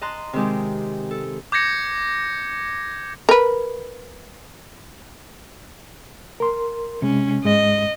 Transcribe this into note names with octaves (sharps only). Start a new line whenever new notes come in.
D#5 A5 A#5 C6 F#6
C3 D#3 G#3 G4
A4
D6 G6 G#6 A#6 C#7
A#4 B4
A#4 C6
C3 G#3 C#4
G#2 G#3 D#5